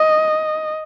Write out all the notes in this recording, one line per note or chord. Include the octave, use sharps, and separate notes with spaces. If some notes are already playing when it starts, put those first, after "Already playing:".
Already playing: D#5